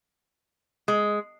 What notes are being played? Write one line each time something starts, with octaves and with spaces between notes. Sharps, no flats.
G#3